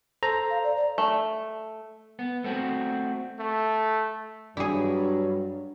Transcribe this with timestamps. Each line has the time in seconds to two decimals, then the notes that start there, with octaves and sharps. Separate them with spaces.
0.23 A4 C5 A#5
0.50 F5
0.64 D5
0.77 D5
0.98 A3
2.19 B3
2.44 A3 C4 F#4
3.39 A3
4.57 G2 F#3 D4 E4 G#4